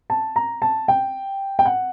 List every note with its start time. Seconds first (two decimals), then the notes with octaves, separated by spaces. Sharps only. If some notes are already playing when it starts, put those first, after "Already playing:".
0.10 A5
0.36 A#5
0.62 A5
0.88 G5
1.59 G5
1.65 F#5